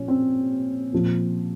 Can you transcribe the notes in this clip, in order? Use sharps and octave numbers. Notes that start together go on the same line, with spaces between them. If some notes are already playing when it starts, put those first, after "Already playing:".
Already playing: A#2 F3 C#4
C4
A#2 F3